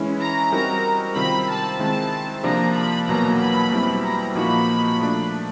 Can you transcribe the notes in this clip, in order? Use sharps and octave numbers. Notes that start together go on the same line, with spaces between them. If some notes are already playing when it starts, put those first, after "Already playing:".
Already playing: E3 G#3 C#4 E4
A#5
G3 C4 D#4 F#4 A#4
C3 D#3 G3 C4 F4 B5
A5
D#3 G#3 C4 E4 A5
C3 F3 A#3 D4 F4 A#5
B5
E2 B2 F#3 A#3 A#5
B5
B2 G3 C4 E4
A#5
A#2 F3 A#3 D#4 F#4 B5
F3 A3 D4